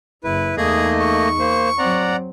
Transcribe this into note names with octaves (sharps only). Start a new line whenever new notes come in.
F#1 E4 B4
E2 A3 A#3 D#4 G#4 D#5
C#6
A#3 C5
F#3 C4 D5 F#5 A#5